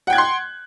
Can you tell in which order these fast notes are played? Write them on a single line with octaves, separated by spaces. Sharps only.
F#5 G5 G#6 F#6 C6